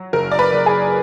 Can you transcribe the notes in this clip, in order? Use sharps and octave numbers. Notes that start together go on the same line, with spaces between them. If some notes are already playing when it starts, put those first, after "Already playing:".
Already playing: F#3
F#1 A#4
D5
B4
F#1
G#4